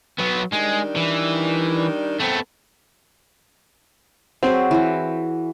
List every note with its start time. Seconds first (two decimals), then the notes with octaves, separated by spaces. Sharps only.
0.18 F#3 B3
0.52 D#3 G3 G#3 D4
0.96 E3
2.20 A3 B3 C4
4.43 F#3 C4 G#4 B4
4.71 E3 F#4